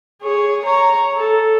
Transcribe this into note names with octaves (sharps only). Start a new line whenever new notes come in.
G#4 C#5
C#5 A#5
A4